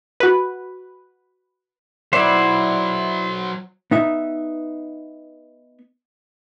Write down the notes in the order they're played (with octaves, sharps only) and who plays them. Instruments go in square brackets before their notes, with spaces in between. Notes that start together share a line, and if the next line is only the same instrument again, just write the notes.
[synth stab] F#4 B4
[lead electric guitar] F#3 B4 [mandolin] E4 D5 [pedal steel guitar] C5 F#5
[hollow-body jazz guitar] B3 D#4 E5